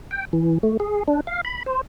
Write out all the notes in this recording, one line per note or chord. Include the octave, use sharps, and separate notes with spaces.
G5
E3
A3
G#4
D4
F5
B5
C5